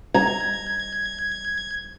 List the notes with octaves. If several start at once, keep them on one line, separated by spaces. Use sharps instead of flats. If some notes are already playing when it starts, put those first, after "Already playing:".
A#5 G#6